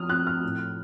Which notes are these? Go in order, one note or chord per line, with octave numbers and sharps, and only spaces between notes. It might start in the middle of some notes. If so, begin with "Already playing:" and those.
Already playing: F3 D#6 F6
C4 F#6
F6
A2